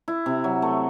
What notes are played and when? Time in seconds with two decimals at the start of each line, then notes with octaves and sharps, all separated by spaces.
0.08 E4
0.26 C3
0.44 F#3
0.62 A3